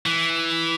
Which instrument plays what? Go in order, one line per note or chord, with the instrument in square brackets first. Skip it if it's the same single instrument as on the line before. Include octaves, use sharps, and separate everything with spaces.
[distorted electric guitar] E3